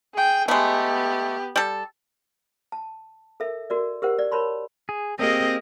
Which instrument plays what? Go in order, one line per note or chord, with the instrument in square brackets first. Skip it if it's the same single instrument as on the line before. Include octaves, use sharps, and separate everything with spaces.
[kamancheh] G#4 G5
[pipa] G#3 A3 [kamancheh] B3 G4
[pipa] G3 A4
[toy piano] A5
A4 A#4 E5
F#4 A#4 D5
G4 A#4 C5 F#5
D5
A#4 C#5 A5 B5 C6
[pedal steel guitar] G#4
[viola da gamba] A#3 G4 A#4 [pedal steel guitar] C4 [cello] G#4 D#5